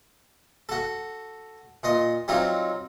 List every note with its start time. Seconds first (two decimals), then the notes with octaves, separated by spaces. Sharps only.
0.69 F#4 A4
1.83 A#2 D#5 C6
2.28 F#3 G3 C4 D#4 F4